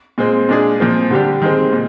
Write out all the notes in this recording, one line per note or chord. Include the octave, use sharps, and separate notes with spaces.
A#2 G#3 C4
A#2 G#3 D4 G#4
A#2 F3 C4
D3 G3 D4 G4
D#3 G#3 C4
A#2